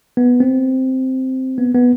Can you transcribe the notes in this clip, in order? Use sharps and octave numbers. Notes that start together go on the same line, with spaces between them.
B3
C4
B3
B3